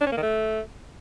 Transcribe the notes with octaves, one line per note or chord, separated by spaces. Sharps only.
D4
C#4
A#3
D#3
A3